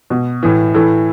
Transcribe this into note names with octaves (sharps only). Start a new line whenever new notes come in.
B2
A2 E3
A2 E3 A4